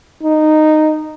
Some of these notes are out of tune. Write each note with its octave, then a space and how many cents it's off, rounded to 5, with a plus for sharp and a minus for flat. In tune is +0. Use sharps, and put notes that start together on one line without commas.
D#4 -10